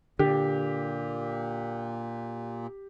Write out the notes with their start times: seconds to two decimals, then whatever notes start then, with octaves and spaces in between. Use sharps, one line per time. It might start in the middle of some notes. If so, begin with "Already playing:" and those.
0.19 A#2 D3 G4